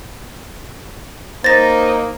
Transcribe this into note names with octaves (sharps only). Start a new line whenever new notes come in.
A#3 D#4 C5 A6 A#6